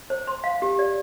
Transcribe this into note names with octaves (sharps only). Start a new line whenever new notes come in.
C5
C6
F5
G4
D5